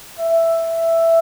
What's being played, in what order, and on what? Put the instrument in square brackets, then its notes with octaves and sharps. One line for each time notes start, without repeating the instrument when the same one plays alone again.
[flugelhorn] E5